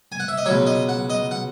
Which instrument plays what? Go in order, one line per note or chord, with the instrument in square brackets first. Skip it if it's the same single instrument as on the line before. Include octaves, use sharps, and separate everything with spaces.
[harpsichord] G#5
F#5
E5
D#5
C#2 B2 F#3 C#5
D#5
F#5
D#5
F#5